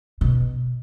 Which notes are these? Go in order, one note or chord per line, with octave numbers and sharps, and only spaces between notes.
B2